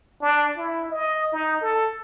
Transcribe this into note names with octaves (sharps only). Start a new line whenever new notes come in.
D4
E4
D#5
D#4
A4